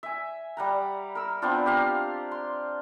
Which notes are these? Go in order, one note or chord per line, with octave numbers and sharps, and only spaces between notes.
E5 G#5
G3 F#5 A#5
A#4 E6
B3 C4 D4 F4
G4 F5 A#5
C6